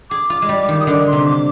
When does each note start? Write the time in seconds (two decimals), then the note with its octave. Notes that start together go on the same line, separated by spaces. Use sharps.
0.10 G#4 D6
0.30 F4
0.42 G#3
0.49 G3
0.68 D#3
0.80 D#6
0.87 D3 D6
1.07 C6
1.13 C3
1.25 D6